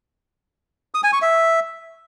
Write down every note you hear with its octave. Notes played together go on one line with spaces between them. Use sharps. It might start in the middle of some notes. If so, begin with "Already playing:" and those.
D#6
G#5
C#6
E5